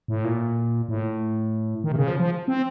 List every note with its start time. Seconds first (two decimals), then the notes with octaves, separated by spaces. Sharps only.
0.08 A2
0.24 A#2
0.89 A2
1.84 D#3
1.92 C3
1.96 C#3
2.08 F3
2.20 F3
2.48 C4